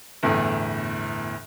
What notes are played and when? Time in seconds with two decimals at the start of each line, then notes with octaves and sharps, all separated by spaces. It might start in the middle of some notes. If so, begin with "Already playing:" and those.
0.23 G1 E2 A2